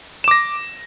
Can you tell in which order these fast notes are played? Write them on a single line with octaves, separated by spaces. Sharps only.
E7 D6 A#6